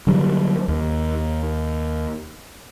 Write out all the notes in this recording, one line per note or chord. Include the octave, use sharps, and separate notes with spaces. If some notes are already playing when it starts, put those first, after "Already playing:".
D3 F#3 G3
D#2